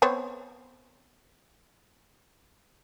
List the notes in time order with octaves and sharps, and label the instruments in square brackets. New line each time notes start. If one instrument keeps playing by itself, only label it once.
[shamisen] B3 C4 C#5